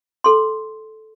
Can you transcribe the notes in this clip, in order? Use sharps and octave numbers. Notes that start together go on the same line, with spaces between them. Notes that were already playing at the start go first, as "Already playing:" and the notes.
A4 C6